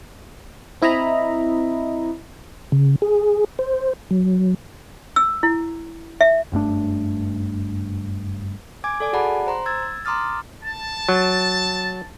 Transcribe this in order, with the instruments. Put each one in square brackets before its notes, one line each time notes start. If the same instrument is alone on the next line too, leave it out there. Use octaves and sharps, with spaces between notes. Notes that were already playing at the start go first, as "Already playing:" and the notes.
[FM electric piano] C4 E4 D#5 E5 A#5 B5
[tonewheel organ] C#3
G#4
C5
F#3
[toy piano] E6
E4
E5
[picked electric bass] F#1 G2 A3 D4
[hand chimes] G#5 D6 G#6
A4 D5 G#5
F#4 G#4 D5 F#5 A5 B5
C5 A#5 C6
E6 G#6 A6
A#5 C6 D6 D#6 F6 A6
[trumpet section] A5
[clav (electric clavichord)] F#3